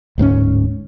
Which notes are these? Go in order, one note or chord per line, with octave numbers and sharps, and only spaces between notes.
D1 G#2 B3 C#4